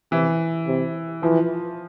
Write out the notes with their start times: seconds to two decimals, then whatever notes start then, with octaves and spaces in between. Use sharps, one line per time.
0.11 C3 E3
0.67 C3
1.23 E3 F3